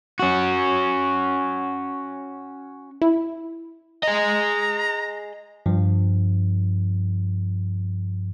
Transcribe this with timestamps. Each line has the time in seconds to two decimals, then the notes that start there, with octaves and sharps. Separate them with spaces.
0.19 C#4 F#4
3.02 E4
4.03 G#4 D#5 A#5
5.66 G2 F3